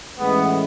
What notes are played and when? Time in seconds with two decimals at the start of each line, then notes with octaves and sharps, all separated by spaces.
0.17 A1 A2 G#3 B3